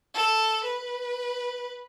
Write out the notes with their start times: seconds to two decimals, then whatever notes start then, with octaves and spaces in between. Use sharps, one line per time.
0.14 A4
0.64 B4